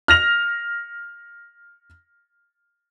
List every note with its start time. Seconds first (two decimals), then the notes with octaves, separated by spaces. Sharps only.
0.08 F6 A#6 F7